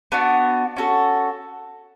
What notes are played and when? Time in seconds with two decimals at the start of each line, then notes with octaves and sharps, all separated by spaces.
0.12 B3 D4 F#4
0.76 C#4 F#4 A4